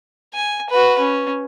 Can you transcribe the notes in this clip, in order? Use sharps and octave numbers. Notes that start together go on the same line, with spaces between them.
G#5
F#4 B4
C#4